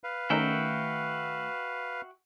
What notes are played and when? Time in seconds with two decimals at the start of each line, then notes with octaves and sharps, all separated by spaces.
0.04 B4 F5
0.30 D#3 A3 C#4 D#4 F#4 A#4 E5 G5